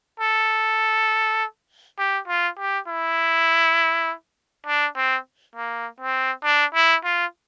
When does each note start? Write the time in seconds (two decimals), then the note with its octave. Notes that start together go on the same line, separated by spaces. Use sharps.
0.20 A4
1.98 G4
2.28 F4
2.58 G4
2.88 E4
4.66 D4
4.96 C4
5.55 A#3
6.00 C4
6.44 D4
6.75 E4
7.05 F4